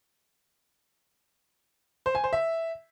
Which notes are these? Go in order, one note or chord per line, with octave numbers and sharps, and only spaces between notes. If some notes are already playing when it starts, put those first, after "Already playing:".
C5
G#5
C5
E5